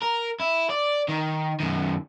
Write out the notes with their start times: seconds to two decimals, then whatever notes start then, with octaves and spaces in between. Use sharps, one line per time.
0.02 A#4
0.40 E4
0.70 D5
1.09 D#3
1.60 F#2 D#3